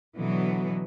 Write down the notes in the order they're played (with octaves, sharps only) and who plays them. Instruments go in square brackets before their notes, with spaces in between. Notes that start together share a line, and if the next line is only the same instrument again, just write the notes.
[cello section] B2 D3 E3 F#3 B3